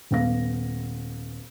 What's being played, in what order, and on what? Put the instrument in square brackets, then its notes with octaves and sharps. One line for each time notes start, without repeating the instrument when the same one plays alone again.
[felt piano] D#1 B3 F5 A#6